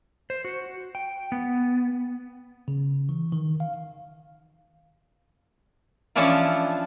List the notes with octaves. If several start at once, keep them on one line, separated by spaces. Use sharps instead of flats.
C5
F#4
G5
B3
C#3
E3
D#3
F5
E3 F3 C#4 D4 E4 F4